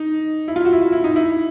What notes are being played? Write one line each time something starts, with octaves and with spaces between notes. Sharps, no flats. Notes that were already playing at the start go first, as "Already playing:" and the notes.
Already playing: D#4
E4
F4
F#4
E4
F4
E4
D#4
E4